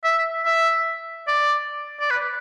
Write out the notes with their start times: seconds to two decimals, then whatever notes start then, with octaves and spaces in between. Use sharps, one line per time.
0.04 E5
0.45 E5
1.28 D5
2.01 D5
2.11 B4